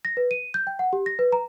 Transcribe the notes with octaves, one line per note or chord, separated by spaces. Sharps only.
A#6
B4
D#7
G6
G5
F#5
G4
A#6
B4
A#5